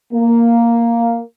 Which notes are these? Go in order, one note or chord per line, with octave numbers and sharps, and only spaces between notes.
A#3